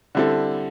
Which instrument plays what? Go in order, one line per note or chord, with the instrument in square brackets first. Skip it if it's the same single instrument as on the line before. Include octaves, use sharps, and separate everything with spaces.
[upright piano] D3 G3 C4 E4 A4